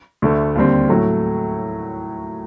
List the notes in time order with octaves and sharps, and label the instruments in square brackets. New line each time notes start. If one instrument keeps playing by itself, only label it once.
[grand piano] D2 D3 A3
D#2 D3 G3 C4
A2 F#3 A3